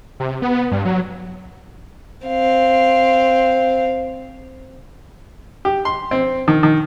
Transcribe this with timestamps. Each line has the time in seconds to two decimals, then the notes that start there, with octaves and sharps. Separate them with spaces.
0.20 C3
0.42 B3
0.71 G2
0.85 F#3
2.27 C4 F5
5.65 G4
5.85 C6
6.11 C4
6.48 D#3
6.63 D#3